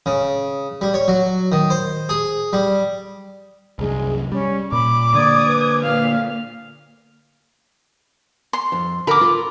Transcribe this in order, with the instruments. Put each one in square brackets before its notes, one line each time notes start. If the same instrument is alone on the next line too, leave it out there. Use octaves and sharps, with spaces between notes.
[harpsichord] C#3
G3
C#5
F#3
D#3
C5
G#4
G3
[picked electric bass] C2 F#2 [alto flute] G#3
[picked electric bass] G3 [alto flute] C#4
[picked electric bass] A#2 [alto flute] B5 [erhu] D6
[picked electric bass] D3 A#3 [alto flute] D5 [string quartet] D#6 G#6
[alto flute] B4
[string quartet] A#2 [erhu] F5
[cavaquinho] C6
[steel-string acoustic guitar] F2
[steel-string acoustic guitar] D3 A#4 A#5 [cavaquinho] B5 D6
[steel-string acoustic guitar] F4